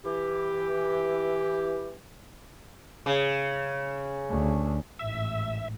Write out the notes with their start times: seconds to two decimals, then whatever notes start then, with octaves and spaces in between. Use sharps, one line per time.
0.05 E3 G4
3.06 C#3
4.30 D2
4.99 A1 G#2 E5